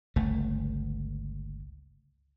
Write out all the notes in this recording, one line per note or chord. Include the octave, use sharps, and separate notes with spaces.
G1 C#2 A3